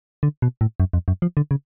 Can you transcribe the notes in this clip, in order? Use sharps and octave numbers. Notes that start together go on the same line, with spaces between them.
D3
B2
A2
F#2
F2
F#2
F3
D3
C#3